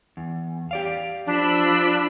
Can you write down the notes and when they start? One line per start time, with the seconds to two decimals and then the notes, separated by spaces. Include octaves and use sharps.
0.17 E2
0.71 G4 D5 F5
1.27 F3 D4 B5 E6